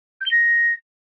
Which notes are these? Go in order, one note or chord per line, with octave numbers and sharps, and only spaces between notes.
G6
G7
A#6